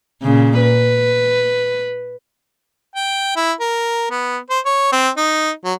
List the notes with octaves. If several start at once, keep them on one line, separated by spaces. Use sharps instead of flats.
A#2 C#3
B4
G5
E4
A#4
B3
C5
C#5
C4
D#4
F#3